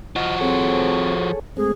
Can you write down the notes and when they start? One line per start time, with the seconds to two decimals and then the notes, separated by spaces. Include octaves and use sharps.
0.16 F3 F#4 D#5 F6
0.41 C4 G#4 A4 C#5
1.57 G#3 A3 C4 G#4